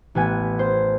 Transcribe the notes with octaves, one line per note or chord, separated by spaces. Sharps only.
A1 B3 G#5 D#7
C5